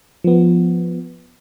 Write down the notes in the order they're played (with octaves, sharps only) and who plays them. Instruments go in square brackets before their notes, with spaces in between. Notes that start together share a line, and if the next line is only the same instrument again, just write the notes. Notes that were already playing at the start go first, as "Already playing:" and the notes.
[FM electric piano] F3 B3